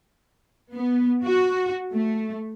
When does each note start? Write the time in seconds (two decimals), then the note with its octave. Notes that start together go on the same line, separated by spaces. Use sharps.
0.73 B3
1.24 F#4
1.94 A3